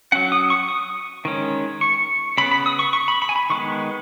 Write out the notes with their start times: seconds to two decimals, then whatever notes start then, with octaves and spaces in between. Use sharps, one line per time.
0.12 F#3 C#4 F#5
0.32 D#6
0.50 C#6
0.69 D#6
1.25 D#3 G#3 C#4
1.81 C#6
2.38 C#3 B3 B5
2.52 B5
2.66 D#6
2.79 C#6
2.93 C#6
3.08 B5
3.22 B5
3.29 G#5
3.36 B5
3.50 D#3 G#3 B3 C#6